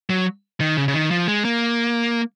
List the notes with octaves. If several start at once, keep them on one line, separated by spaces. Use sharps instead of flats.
F#3
D#3
C#3
C#3
D#3
F3
G#3
A#3